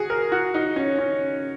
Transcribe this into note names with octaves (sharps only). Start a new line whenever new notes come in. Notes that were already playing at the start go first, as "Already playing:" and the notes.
Already playing: F#4 G#4
A#4
F#4
D#4
C#4
C#4